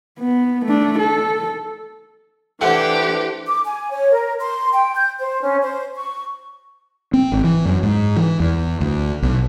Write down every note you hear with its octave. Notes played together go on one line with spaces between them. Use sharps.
B3
A3 D4
A4
E3 A3 D4 G4 C5 F#5
D6
G#5
C#5
A#4
C6
G5
G6
C5
C#4
C5
C#6
C4
G#1
E3
F#2
G#2
E3
E2
D2
B1